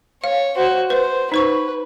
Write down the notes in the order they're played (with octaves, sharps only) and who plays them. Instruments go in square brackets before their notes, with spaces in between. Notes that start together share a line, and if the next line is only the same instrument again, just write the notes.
[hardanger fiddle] C#5 [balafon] F5
[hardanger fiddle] F#4 C5
[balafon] B4 [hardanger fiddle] C5
[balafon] D#4 C5 C#6 [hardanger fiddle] B4